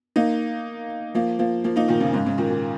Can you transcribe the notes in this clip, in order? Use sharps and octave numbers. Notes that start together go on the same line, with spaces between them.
A#3 D#4
F3 A#3
F3 A#3
F3 A#3
A#3 D#4
A#2 D#3
C#3 F3
G#2 C#3
G#2 C#3
A#2 D#3
A#2